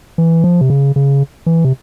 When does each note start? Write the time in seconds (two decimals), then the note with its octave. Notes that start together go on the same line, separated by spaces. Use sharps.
0.18 E3
0.44 F3
0.61 C3
0.70 C#3
0.96 C#3
1.46 E3
1.65 C3